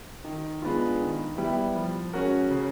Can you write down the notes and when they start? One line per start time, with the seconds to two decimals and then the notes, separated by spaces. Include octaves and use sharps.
0.25 D#3
0.62 G#3 B3 D4 F4
1.00 D#3
1.37 G3 B3 E4
1.75 F3
2.13 G#3 C#4 F#4 A#4
2.51 C#3